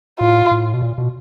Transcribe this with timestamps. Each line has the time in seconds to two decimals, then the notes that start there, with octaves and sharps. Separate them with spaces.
0.20 A2 F4
0.51 A2
0.74 B2
0.82 A#2
0.98 B2